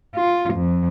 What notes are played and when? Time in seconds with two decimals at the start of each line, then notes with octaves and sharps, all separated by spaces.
0.15 F4
0.54 F2